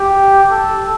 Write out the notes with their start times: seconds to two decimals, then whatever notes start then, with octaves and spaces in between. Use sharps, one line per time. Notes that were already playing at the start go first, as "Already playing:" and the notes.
Already playing: G4
0.51 A4